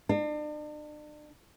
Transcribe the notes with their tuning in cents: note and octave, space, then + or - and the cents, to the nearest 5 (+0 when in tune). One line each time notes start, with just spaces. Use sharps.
D4 +40